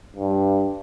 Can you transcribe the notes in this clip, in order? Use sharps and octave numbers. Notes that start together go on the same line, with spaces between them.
G2